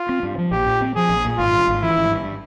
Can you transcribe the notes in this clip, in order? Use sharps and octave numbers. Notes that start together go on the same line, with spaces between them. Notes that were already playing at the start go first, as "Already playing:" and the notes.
Already playing: F4
C4
G2
F3
A#1 G4
A#2
C4
F3 G#4
A#1
A#2
G#1 F4
G2
G#1
E3 E4
G#1
G2